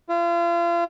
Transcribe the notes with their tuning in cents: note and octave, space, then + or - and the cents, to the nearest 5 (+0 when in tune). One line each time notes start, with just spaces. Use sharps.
F4 -35